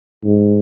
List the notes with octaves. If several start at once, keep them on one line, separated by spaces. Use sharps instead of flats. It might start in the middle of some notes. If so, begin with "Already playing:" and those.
G#2